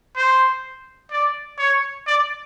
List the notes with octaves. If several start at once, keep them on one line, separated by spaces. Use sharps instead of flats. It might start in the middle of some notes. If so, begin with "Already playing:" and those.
C5
D5
C#5
D5